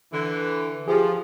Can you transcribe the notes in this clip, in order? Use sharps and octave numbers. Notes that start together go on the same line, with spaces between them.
D3 E3
F3 G4 G#4